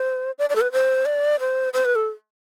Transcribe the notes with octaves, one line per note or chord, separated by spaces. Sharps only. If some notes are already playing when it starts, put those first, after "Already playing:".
Already playing: C5
D5
D5
A4
B4
C5
D5
C5
C5
B4
A4